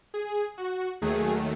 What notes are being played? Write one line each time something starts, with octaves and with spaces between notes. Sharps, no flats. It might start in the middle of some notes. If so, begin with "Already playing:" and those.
G#4
F#4
D#2 D#3 F#3 A3 G#4